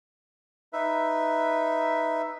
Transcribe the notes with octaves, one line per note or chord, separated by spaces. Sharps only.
D#4 B4 E5